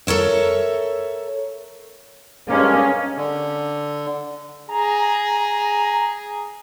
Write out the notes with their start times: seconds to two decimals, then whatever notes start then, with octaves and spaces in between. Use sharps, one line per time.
0.07 A4 A#4 C#5 E5
2.49 G2 G#3 A#3 C#4
3.16 D3
4.69 G#4 A#5